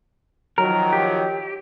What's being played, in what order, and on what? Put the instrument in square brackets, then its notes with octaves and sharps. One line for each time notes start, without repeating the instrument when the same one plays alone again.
[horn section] D#3 F3 F#3 [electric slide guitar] A#4
[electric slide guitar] G4